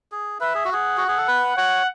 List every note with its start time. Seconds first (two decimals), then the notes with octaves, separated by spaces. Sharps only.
0.12 G#4
0.40 B4 E5
0.55 G#4
0.65 F#4
0.70 G#4 F#5
0.97 F#4 F#5
1.08 G#4
1.17 A4
1.28 B4
1.57 C#5 F#5